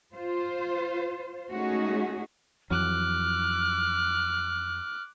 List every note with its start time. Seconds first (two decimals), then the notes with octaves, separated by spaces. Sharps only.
0.14 F4 C5
1.50 G#3 A3 C#4 D#4 F#4 G#4
2.70 F2 E3 F#3 D6 F6 F#6